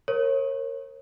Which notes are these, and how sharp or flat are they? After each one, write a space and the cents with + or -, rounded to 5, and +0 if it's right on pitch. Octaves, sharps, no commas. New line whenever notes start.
A#4 +0 C#5 -35